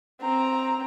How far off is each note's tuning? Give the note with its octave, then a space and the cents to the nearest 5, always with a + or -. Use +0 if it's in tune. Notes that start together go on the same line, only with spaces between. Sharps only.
C4 +5 A#5 +0